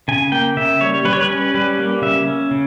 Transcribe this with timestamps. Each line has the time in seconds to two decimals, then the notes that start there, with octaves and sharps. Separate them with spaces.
0.08 C#3 G#5
0.32 A#3 G5
0.57 C#3 E5
0.81 G3 C#5
1.05 G3 B4
1.13 C#5
1.21 B4
1.30 C#4
1.54 G3 B4
1.79 A#3
2.02 C#3 E5
2.27 C#4
2.51 C#3